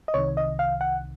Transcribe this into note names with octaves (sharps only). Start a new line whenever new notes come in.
D#5
C2 C3 D#3 C#5
D#5
F5
F#5